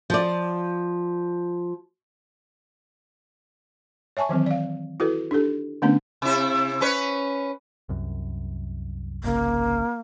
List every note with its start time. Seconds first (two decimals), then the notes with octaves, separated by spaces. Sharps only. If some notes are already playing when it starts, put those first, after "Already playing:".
0.10 F3 D5
4.17 C#5 E5 G#5 A5 C#6
4.29 D#3 E3 F#3 C4
4.46 D5 F5
5.00 E4 F#4 A4 B4
5.31 D4 D#4 G4 A4
5.82 D3 A3 B3 C#4 D4
6.22 C3 E4
6.81 C#4 B4 C#5
7.89 C2 F#2
9.24 G1 C2 C#3 A#3